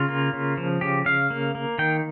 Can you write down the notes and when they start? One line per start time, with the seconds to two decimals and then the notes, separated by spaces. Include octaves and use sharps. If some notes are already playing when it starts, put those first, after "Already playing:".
Already playing: C#3 F4
0.09 A#3
0.33 C#3
0.57 F3
0.81 C#3 G4
1.06 C#3 F5
1.30 A#3
1.55 A#3
1.79 D#3 G5